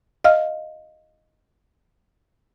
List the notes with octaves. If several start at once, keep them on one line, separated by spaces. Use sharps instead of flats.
D#5 F5 F6